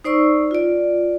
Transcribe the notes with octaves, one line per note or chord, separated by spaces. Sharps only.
D#4 C5 D5 C#6 E6
F4 D5